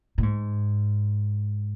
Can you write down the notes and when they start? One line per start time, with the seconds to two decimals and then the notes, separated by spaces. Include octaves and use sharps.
0.18 A#2
0.23 G#2